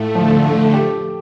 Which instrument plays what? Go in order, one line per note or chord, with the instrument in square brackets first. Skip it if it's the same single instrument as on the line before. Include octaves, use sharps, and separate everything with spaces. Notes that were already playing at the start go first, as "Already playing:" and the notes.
Already playing: [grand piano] A2 F4 [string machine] A3
[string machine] D3 [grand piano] F3
[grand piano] A3
[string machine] F3 [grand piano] G4